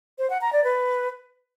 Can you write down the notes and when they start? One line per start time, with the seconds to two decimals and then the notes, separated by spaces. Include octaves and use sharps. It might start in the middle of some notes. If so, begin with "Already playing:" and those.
0.19 C5
0.30 F#5
0.41 A#5
0.53 D5
0.64 B4